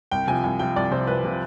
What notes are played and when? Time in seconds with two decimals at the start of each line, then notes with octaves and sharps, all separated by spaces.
0.11 C2 G5
0.27 C3 F3 G#5
0.43 C2 G#5
0.59 C3 F3 G5
0.76 C2 D5
0.91 C3 F3 C5
1.07 C2 B4
1.25 C3 F3